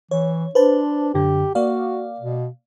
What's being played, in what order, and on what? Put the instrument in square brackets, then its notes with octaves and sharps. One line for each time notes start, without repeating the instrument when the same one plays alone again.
[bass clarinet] E3 [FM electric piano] C#5
[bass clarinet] D4 [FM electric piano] B4 C5 A5
[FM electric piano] F#2 D3 [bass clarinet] G4
[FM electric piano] A#3 D5 F5 [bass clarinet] F#4
[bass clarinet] B2